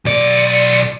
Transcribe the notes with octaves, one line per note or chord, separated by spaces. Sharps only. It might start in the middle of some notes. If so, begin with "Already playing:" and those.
B1 D5